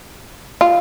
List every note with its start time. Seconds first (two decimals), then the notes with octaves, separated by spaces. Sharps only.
0.61 F4